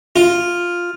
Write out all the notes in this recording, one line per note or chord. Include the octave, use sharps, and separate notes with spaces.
F4